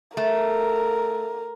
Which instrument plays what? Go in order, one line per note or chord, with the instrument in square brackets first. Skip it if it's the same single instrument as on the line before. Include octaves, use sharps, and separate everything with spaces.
[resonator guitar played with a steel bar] A3 [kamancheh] A#4